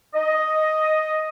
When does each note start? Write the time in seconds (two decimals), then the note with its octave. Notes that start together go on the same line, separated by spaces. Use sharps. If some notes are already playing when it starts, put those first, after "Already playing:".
0.15 D#5